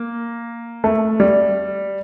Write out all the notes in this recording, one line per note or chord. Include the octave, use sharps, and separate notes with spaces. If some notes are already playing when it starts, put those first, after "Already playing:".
Already playing: A#3
A3
G3